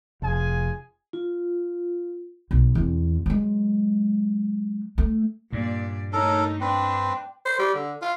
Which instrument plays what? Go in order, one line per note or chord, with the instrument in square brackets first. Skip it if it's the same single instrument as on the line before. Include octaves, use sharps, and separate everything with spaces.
[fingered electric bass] F1 [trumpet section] F4 G#4 G#5
[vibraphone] F4
[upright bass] B1
E2 C4
F#3 G#3
A3
[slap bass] G2 [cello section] A#2 D5
[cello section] G3 A3 D#4 [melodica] A4 A#4 [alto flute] C#5
[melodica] C4 B4 [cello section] D4 [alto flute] G5
[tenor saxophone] C5
G3
D3
F4